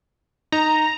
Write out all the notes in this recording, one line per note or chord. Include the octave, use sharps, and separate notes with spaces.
D#4 A#5